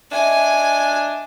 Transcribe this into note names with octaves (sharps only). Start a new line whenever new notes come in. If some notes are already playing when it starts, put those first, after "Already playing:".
D4 D#5 E5 G#5